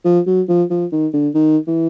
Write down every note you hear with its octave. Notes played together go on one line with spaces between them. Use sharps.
F3
F#3
F3
F3
D#3
D3
D#3
E3